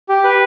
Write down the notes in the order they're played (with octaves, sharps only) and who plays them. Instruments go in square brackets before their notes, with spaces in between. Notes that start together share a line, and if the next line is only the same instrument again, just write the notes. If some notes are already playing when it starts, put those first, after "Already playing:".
[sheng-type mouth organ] G4
B4